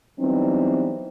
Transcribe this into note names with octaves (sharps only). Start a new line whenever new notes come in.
E3 F#3 G3 B3 C4 D#4